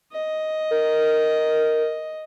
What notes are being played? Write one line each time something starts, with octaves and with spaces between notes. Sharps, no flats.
D#5
A#4